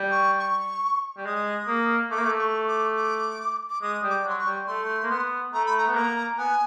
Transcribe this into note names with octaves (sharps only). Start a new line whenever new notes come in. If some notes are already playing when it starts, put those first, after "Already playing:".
Already playing: G3
C#6
C#6
G3
G#3 D#6
A#3
A3 D6
A#3
A3
C#6
D6
D6
D6
G#3 D#6
G3
D6
F#3 C6
C#6
G3
A3 C6
A#3
B3
A3 A#5
B5
A#5
B3
A#3 A#5
B3 G#5